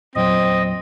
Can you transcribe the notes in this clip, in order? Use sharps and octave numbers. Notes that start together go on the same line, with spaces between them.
E2 A#2 F#3 C4 D#5